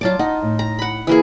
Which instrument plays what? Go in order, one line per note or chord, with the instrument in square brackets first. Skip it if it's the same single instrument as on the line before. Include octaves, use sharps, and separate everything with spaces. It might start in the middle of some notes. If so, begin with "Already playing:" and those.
[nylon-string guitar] F#3 D5 [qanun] F4 A5 D6
[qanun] D#4 [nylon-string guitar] F#5
[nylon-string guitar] A2
[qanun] A#5
F#5 B5
E3 A#3 G#4